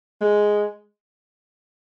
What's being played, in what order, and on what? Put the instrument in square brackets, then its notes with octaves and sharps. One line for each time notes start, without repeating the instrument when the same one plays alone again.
[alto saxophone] G#3